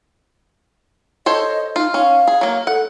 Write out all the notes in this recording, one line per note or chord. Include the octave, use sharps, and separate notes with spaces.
A4 C5 C#5 D#5
D#4 F4
C#4 F5
G#4
F#3 A#3
A4 F#5